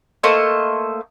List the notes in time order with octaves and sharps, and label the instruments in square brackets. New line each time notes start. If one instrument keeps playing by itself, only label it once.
[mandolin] A3 A#3 C5 D#5